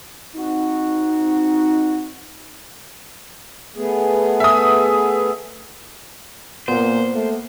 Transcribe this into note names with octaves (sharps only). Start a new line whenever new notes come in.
C4 D#4 F#4
A3 B3 G#4
E5 D#6
A#2 A#3 B3 C5
A3